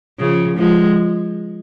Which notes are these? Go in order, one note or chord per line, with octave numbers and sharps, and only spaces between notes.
C#3 F3
F3 G#3